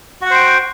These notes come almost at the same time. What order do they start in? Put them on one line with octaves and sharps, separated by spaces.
F#4 F#5 C5 G5